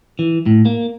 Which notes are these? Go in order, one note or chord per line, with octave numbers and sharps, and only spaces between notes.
E3
A2
A#3